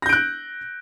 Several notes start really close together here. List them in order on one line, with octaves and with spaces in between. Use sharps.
A#6 G6 D7 F#6